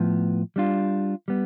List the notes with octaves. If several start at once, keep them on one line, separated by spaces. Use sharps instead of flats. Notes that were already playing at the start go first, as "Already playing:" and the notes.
Already playing: A2 F3 B3
G3 D4 F4
G3 B3